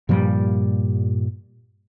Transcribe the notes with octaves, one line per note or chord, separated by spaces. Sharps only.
G2 A#2 F3 G3